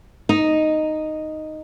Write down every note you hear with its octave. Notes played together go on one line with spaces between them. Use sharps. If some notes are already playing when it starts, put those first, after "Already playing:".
D#4